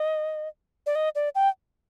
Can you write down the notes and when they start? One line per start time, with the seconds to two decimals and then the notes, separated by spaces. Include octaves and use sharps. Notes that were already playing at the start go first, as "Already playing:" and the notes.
Already playing: D#5
0.86 D5
0.95 D#5
1.15 D5
1.35 G5